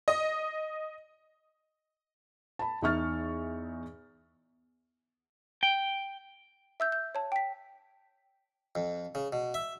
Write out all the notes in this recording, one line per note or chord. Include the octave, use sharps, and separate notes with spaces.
D#5
A5 B5
E2 D#4 E5 C#6 F6 A6
G5
E5 E6 G6
G6
C#5 A5
G5 B6
F2
C#3
B2
E5